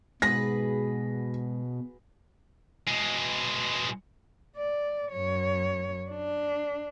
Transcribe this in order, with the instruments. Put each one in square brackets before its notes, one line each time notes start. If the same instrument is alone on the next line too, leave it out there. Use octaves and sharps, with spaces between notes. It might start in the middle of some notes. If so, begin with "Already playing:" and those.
[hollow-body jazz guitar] G#2 [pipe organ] B2 [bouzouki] F#4 G#4 B4 [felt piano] A#6
[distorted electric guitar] B2 G#3
[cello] D5
F#2 C#5
D4